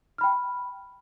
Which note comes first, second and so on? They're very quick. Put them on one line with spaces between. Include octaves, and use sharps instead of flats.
F6 B5 G5